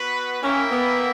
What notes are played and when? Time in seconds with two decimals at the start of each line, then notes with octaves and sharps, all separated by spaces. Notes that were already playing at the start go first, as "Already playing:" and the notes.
Already playing: B3 F#4 B4
0.41 A#3 C#4 E4 A#4 E5 G5
0.71 B3